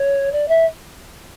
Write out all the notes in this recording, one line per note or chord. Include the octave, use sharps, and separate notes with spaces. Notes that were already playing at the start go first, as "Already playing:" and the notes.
Already playing: C#5
D5
E5